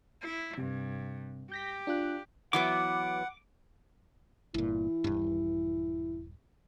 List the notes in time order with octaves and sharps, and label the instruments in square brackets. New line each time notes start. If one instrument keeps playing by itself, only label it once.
[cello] E4
[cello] G2 [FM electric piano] C3
[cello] G4 [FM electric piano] G6 A#6 B6
[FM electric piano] D4 F4 F#6
[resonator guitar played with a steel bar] E3 F#3 B3 [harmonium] F#5 [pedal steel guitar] D6
[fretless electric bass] G1 A#2 [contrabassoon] E3
[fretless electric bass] D#1 G2